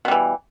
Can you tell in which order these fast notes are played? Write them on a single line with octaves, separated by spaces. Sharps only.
B2 G3 E3